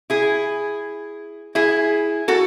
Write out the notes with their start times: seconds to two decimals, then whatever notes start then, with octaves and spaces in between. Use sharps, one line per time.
0.10 E4 G#4
1.55 E4 G#4
2.28 F#4 A4